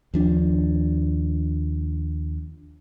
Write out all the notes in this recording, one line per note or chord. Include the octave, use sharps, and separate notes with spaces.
D#2 F3 D4